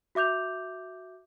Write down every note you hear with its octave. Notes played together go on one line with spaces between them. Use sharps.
F#4 E5 D6 G6 F7